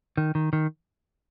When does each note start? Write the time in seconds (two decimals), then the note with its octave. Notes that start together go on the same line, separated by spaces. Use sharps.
0.17 D#3
0.35 D#3
0.53 D#3